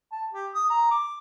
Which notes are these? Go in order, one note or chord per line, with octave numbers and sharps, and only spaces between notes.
A5
G4
D#6
A#5
D6